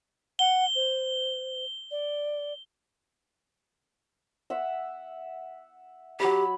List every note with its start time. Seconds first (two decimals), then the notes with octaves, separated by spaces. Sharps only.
0.39 F#5 G7
0.75 C5
1.91 D5
4.50 E5 F#5
6.20 F#3 G4 B5